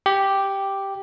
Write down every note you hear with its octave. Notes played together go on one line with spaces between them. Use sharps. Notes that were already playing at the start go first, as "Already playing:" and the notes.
G4